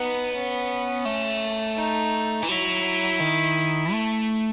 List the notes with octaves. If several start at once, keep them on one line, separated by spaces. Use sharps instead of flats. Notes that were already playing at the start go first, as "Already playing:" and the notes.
Already playing: B3 D#4
C#4
A3
D#4
E3
F#3 E4
D#3
A3